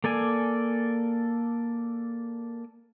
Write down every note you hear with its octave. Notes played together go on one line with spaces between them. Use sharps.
A#3 A4 D5 G#5